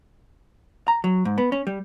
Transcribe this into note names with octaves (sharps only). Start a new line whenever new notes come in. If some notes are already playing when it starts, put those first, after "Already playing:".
A#5
F#3
G#2
B3
C#4
G3